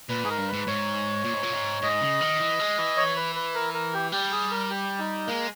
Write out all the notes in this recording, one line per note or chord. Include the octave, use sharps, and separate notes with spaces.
A#2 B4
G#2 G#4
A#4
G2
G#2 B4
G#2 C#5
A#2
G#2
A#2
G#2
G#2 D#5
C#3
D#3
E3
G#3
E3
C#5
B4
B4
A#4
A#4
G4
G3 G4
G#4
A#4
G4
D#4
G#3 A#3